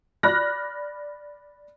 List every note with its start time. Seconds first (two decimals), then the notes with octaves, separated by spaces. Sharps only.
0.23 D5 B5 F6 F#6 A#6